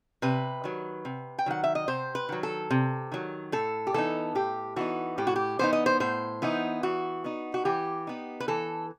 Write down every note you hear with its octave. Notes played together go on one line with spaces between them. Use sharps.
C3 B4
D#3 F#3
C3
G5
D#3 F#3 F#5
E5
D#5
C3 C5
B4
D#3 F#3
A4
C3
D#3 F#3
A2 A4
G4
E3 B3 D#4 A4
A2 G4
E3 B3 D#4 F#4
A2 G4
F#4
G4
E3 B3 D#4 C5
D#5
C5
A2 C5
E3 B3 D#4
E3 F#4
B3 D#4
F#4
E3 G4
B3 D#4
B4
E3 A4